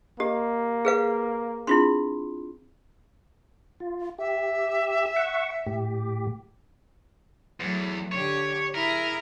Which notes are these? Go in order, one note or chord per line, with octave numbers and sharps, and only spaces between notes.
A#3 G4 D#5
G#4 B4 F5
C4 D4 E4 F4 G#4 C6
F4
G4 E5
F#5 C#6
A2 G4
E2 F#3 A3
D3 G4 C#5
E4 G#4 A#4